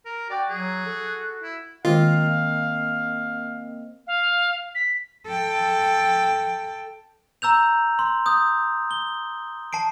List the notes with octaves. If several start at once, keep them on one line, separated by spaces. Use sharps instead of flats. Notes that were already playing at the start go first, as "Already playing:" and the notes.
A#4
F#4 D5 G5
F#3 G#4
A4
E4
D#3 G#3 A#3 C4 F4 D#5 F5
F5
B6
A4 G5
A#5 E6 G6 F7
C6
D#6 G6
G7
A5 C7 D7